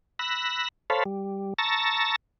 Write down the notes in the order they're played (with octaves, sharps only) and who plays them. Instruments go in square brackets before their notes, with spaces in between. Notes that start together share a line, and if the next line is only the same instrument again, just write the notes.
[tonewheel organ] B5 E6 F#6 A#6
A4 C5 C#5 F5 A5 B5
G3
A5 A#5 C#6 E6 A6 A#6